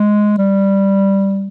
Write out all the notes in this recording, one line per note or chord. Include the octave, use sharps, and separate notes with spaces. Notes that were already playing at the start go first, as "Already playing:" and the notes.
Already playing: G#3
G3